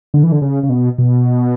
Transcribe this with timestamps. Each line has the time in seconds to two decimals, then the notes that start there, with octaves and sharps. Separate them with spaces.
0.14 D3
0.23 E3
0.32 D3
0.42 C#3
0.63 C#3
0.70 B2
0.98 B2